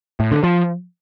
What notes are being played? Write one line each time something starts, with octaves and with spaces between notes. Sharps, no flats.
A2
D3
F3